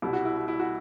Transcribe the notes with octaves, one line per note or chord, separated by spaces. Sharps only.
C2 B2 G3 E4
F#4
E4
F#4
E4
F#4